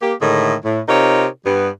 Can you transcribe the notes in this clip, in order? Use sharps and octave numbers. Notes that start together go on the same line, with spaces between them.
A#3 G4
A2 D3 D#3 G#3 A3
A2
C3 D#4 F4 A#4 C#5
G2 G3 B3